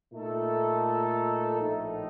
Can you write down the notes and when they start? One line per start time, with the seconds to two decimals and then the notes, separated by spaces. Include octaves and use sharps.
0.12 A#2 A3 D#4 A4
1.56 A#1 A2 A3 D#4